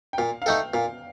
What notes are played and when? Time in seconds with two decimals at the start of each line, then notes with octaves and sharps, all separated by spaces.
0.13 G5
0.18 A#2 F5
0.42 F5
0.46 A3 D#4 A4 G5
0.74 A#2 F5